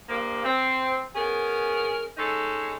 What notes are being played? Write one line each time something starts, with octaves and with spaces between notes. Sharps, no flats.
G2 F3 A#3
C4
B3 C#4 G#4 A#4
G#3 C#4 D#4 A4